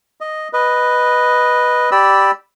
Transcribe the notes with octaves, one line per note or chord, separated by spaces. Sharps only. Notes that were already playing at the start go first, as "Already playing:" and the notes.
D#5
B4 D#5
G4 D5 B5 E6